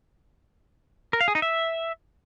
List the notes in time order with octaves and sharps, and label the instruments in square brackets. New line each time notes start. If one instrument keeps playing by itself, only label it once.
[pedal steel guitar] A#4
F5
G#4
D#4
E5